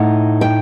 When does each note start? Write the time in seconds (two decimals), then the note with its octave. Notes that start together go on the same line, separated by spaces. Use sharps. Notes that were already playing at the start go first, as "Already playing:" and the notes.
Already playing: A2 D#4 F#5
0.41 G5